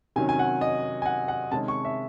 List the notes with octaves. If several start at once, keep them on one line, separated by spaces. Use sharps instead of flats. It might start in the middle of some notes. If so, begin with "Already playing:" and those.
C3 D#3 F#3 C#4 G#5
G#5
F#5
D#5
G#5
F#5
F#5
C3 D#3 G#3 C#4 A5
C#6
E5